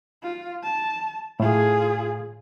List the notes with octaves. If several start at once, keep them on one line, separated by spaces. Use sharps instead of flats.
F4
A5
A2 F4 G#4